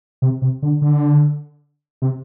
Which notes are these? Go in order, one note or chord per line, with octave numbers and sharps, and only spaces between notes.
C3
C3
D3
D3
C3